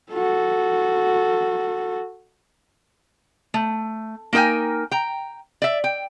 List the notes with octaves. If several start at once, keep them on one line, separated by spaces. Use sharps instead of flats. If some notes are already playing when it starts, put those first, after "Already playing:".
F#4 A4
A3
A#3 D#4 A#4 G5 G#5
G5 A#5
D5 E5
G5